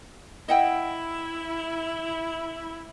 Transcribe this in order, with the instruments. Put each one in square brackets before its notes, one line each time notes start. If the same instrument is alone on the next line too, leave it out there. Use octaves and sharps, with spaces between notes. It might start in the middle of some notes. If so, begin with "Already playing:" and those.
[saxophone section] E4 [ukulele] D#5 F#5 G5